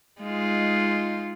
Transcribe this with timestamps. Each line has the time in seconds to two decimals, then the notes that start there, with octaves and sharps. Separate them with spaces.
0.21 G#3 D#4 F4